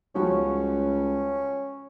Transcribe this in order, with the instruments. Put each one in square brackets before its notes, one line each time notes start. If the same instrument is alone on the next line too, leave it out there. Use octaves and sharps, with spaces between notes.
[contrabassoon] C#2 [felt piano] F3 G3 F#4 [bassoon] C#4